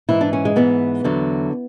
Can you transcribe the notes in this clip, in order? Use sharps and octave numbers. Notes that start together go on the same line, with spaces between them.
G#2 E3 E4
D4
C#4
G#3
G#2 E3 B3
E2 D3 F#3